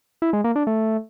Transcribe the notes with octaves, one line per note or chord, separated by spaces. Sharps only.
E4
G#3
A#3
D4
A3